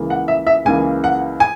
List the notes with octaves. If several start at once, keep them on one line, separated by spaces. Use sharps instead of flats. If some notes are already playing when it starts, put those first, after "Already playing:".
Already playing: C#2 C#3 E3 A#3
F#5
E5
E5
C#2 C#3 E3 A#3 G#5
F#5
G#5